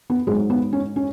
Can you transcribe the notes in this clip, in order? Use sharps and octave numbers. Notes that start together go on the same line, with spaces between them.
B3
G#2 F#3 G#3
B3
C#4
C#4